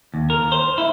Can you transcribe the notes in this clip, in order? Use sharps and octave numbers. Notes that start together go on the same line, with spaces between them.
D#2
A#4
C5
E4